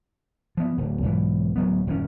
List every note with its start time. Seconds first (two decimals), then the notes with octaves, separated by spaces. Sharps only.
0.57 F3 B3
0.77 D1 D2
1.03 B1 G#2 E3
1.56 D1 F#3 B3
1.87 D#1 F#2 D#3 C#4